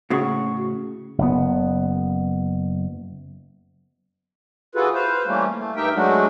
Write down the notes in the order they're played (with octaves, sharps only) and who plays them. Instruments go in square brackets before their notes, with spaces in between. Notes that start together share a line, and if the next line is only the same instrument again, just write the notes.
[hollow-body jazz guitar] A2 C#3 [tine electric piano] F#4 C#6
[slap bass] F#1 B3
[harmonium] E3 F4 F#4 G#4 A4 B4
B4 C5 F5
E3 G3 A3 A#3 C#4
A3
G2 D#4 G4 A#4 E5 G5
F#3 G#3 A3 D4 F#4